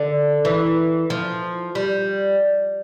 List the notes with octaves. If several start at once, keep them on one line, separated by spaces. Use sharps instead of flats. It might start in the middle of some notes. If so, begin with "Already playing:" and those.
Already playing: D3
E3
F3
G3